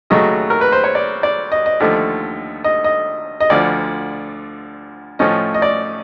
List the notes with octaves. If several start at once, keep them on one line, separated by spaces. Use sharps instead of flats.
D#2 C#3 F#3 A3 D#5
A#4
B4
C5
C#5
D5
D5
D#5
D#5
D#2 D3 F3 A3
D#5
D#5
D#5
D2 D3 F3 D5
A2 F3 A3 C#4 D#5
D#5
D5